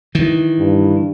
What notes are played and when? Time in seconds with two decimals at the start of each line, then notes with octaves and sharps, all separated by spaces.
0.15 D#3 E3
0.59 G2